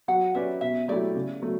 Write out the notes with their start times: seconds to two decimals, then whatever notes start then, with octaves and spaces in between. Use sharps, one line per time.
0.08 F#3 F#5
0.35 C#4 G4 B4 D5 E5
0.61 B2 E5
0.88 F#3 A3 E4 G4 D5
1.15 C#3
1.42 F#3 A3